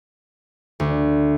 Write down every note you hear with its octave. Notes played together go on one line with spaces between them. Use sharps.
D2